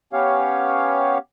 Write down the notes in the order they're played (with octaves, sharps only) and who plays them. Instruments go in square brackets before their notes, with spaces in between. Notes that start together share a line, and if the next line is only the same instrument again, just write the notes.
[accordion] B3 C#4 G4 C#5 F5